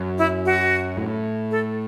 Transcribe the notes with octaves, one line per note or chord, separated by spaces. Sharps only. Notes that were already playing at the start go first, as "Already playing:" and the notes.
Already playing: F#2
E4
F#4
A2
A4